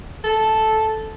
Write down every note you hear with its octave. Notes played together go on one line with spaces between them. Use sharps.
A4